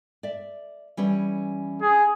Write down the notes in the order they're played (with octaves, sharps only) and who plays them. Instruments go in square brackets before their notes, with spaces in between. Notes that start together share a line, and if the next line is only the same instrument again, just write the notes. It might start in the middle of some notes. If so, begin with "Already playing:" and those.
[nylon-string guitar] D5 E5
E3 G3 C#4
[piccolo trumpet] G#4